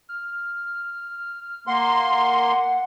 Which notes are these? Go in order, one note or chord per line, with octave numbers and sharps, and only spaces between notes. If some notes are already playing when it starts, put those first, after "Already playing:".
F6
A#3 F#5 C6